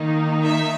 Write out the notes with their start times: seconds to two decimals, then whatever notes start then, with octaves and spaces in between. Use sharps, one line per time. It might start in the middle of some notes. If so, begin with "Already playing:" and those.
Already playing: D#3 A#3 D#4
0.45 E5